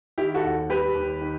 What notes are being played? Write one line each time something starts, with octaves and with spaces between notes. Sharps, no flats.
D#3 E4 G4
F#4 A4
D#2
G3 G4 B4
D#2
D#3